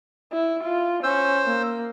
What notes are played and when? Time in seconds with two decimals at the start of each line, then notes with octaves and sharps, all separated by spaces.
0.33 E4
0.64 F4
1.03 C#4 C5 E6
1.45 A#3